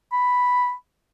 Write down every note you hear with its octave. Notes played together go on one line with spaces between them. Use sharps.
B5